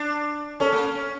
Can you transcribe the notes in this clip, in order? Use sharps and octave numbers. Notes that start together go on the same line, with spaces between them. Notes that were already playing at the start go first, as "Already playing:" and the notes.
Already playing: D4
C#4 A4 C#5
A#3
C#4
C#4